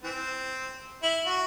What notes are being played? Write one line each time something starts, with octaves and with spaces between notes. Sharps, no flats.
E3 C4
E4
F#4